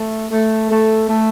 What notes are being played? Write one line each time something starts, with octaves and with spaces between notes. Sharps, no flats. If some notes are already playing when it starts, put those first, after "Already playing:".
Already playing: A3
A3
A3
A3